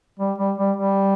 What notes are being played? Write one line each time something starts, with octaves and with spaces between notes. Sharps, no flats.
G3
G3
G3
G3